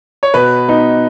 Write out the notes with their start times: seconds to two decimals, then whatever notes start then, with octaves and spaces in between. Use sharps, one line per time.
0.23 C#5
0.34 B2 B4
0.68 B3 D#4